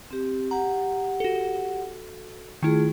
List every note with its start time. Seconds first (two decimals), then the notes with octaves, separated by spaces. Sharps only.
0.11 C4 G4
0.51 G4 F#5 A#5
1.20 F#4 A4
2.63 D#3 A3 E4 F4 G#4